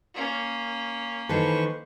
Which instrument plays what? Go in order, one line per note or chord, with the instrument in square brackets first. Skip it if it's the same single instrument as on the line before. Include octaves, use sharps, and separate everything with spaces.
[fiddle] A#3 C#4
[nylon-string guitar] D#3 E3 A4 [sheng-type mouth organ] B4 C5 C#6